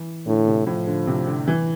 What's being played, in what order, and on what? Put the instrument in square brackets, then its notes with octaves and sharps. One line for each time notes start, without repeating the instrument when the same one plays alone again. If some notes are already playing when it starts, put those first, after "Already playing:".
Already playing: [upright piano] E3
[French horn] A2 [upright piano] D3
[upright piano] C3
[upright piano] A2 [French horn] F3
[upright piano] D3
C3
D3
E3